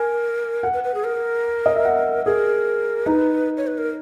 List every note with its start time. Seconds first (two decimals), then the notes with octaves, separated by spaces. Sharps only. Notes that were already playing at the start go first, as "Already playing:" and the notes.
Already playing: A#4 G#5
0.63 F#5
0.73 B4
0.84 B4
0.94 G#4
1.04 A#4
1.66 D#5
1.76 E5
1.85 F#5
2.26 G#4 A#4
3.06 D#4 B4
3.57 C#5
3.67 B4
3.78 A#4